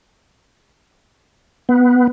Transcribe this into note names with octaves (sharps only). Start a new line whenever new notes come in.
B3